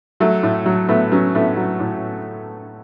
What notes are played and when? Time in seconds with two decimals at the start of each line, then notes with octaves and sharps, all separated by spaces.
0.20 F#3 A3
0.43 A2
0.66 F#3
0.88 A2 A3 B3
1.11 F#3 B3 C#4
1.35 A2 A3 B3
1.57 F#3
1.80 A2